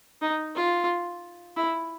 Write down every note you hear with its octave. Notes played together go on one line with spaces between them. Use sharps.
D#4
F4
E4